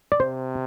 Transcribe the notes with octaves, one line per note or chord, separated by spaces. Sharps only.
D5
C3 C5